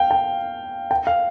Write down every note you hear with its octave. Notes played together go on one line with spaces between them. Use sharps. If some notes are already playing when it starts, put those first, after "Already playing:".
Already playing: F5 G5
G5
G5
F5